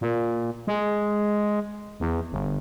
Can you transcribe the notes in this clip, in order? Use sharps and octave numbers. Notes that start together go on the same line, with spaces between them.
A#2
G#3
E2
G1